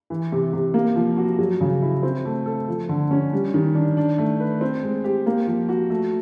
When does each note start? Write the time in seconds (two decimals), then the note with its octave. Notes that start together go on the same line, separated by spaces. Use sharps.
0.10 E3
0.32 C3
0.53 C3
0.74 A#3
0.96 F3
1.17 F#4
1.39 F#3
1.61 C#3
1.82 E4
2.03 C4
2.25 A3
2.46 A4
2.69 F3
2.89 D3
3.11 C#4
3.33 G3
3.54 D#3
3.75 D4
3.97 D4
4.18 A3
4.40 B4
4.61 C4
4.83 G#3
5.04 G4
5.26 A#3
5.47 F3
5.69 F#4
5.90 A3